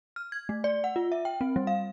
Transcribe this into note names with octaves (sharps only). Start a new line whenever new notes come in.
F6
G#6
A3
D5
F#5
F4
E5
G5
C4
G3
F5